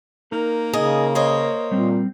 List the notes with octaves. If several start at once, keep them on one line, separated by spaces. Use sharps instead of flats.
A#3 D#4 A#4
C#3 G#4 D#5
G#4 C5 C#5 D#5
A#2 G3 C4